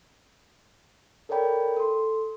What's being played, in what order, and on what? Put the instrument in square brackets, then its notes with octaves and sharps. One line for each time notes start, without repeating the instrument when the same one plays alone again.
[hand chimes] A4 A#4 C#5 D5 G5 B5
A4 C6